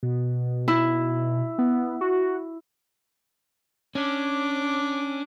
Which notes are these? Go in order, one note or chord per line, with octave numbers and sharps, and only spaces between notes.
B2
E4
B3
F#4
C#4 D4 D6